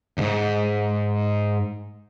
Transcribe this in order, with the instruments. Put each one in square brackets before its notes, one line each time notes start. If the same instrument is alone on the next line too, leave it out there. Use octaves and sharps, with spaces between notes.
[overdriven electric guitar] D2 G#2